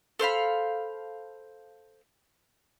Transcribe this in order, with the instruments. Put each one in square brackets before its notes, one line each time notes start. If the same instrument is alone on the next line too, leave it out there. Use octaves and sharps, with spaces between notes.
[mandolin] A4 C5 F5 B5